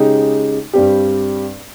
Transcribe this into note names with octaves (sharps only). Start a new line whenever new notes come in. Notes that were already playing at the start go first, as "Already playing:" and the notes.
Already playing: C#3 G#3 D#4 G4
G2 G3 C4 G4